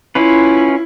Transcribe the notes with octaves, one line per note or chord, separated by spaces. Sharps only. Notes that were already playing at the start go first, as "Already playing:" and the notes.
C#4 E4 F4 B4